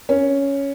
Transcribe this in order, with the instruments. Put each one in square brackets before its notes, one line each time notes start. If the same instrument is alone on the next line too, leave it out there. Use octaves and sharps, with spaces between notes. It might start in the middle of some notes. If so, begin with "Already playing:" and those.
[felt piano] C#4